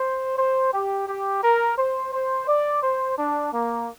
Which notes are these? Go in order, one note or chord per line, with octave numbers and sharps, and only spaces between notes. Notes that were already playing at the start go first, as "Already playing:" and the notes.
Already playing: C5
C5
G4
G4
A#4
C5
C5
D5
C5
D4
A#3